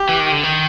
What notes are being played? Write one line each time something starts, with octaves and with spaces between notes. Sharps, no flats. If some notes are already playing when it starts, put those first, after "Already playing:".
Already playing: G4
E3
D#3
D3
D#3